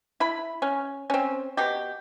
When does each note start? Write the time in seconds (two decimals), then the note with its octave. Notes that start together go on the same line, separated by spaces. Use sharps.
0.20 E4 B5
0.62 C#4
1.10 C4 C#4
1.57 B2 G4